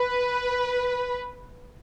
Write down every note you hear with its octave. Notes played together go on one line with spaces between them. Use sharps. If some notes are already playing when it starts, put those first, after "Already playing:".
Already playing: B4